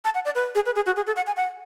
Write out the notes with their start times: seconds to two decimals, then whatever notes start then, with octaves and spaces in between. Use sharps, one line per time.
0.05 A5
0.15 F#5
0.25 D5
0.35 B4
0.55 G#4
0.66 B4
0.76 G#4
0.86 F#4
0.96 G#4
1.07 A4
1.16 F#5
1.27 G#5
1.37 F#5